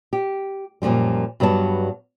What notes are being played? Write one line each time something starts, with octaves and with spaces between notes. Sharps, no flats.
G4
F#2 A#2 E3 F3 G3
G2 F#3 G3 B3 A5